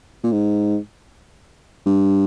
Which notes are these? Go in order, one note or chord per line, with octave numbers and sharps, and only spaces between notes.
A#2
G#2
G2